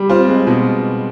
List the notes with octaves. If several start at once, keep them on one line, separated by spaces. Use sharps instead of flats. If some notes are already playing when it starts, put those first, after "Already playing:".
Already playing: G3
C4 F4
G#3
B2